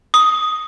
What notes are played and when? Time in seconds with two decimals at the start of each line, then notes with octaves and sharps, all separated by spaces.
0.14 D#6